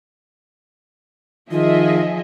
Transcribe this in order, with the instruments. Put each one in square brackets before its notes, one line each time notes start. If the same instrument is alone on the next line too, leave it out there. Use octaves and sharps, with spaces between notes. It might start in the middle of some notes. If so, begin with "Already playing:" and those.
[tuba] D#3 [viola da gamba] F3 [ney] F4 [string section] G#4 D#5 E5